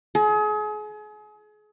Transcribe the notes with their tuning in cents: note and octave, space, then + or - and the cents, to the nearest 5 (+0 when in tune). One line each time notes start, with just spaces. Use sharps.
G#4 +35